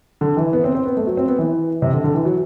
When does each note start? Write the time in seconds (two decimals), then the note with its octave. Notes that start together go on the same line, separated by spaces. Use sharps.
0.21 D3
0.37 E3
0.53 B3
0.64 C4
0.75 C4
0.86 B3
0.97 A3
1.07 F#3
1.17 C4
1.28 B3
1.39 E3
1.82 C3
1.93 D3
2.04 D3
2.14 E3
2.25 F#3